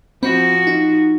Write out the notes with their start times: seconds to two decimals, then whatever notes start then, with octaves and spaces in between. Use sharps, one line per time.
0.23 F3 C4 F#4 B5
0.67 D#4